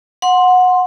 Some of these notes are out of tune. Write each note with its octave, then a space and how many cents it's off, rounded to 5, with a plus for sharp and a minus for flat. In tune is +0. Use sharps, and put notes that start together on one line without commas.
F#5 -20 C6 +0